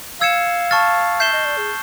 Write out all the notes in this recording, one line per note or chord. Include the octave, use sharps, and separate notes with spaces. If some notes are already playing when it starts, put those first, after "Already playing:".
F5 E6 G#6 C#7 E7
A5 C#6 F6 A6
E5 G6 C7 E7 G7
D#5
D5
G#4